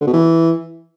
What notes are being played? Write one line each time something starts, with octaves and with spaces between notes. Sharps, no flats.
D3
B2
E3